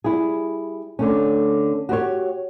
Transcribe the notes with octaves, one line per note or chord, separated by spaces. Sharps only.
G3 E4 G#4
D3 A3 C#4
F#4 G4 C5 C#5